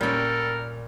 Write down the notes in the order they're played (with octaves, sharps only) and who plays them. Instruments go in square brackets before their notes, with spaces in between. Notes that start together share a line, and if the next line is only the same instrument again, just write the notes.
[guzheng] A#2 G5 [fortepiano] G3 C#4 [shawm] A4 [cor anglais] A#4